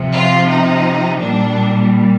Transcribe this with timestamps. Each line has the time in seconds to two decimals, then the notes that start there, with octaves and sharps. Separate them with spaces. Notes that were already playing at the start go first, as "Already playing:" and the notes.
Already playing: C3 F3
0.14 F4
0.49 D#4
1.21 A#2 G3 D4